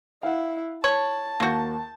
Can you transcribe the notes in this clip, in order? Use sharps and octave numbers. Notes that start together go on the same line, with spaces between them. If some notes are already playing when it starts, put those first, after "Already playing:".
E4 F5 F#5
C#5 A5 F#7
D#2 A#3 F#4 C#6 G6